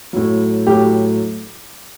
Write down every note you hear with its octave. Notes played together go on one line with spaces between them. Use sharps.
A2 F#3
A2 F#3 G4